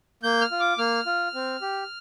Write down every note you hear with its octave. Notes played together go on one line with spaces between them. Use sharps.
A#3 G6
F6
F4
D6
A#3 F6
F4
C4
G4